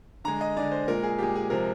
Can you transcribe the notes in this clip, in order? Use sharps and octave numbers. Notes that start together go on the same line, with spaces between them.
D3 G#3 A#5
D#5
D3 G#3 D5
C5
A#2 G#3 A#4
G#4
A#2 G#3 G4
G#4
C3 F3 G#3 A#4